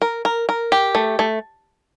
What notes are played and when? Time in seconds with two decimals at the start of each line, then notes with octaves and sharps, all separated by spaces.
0.02 A#4
0.25 A#4
0.49 A#4
0.72 G4
0.95 A3
1.19 A3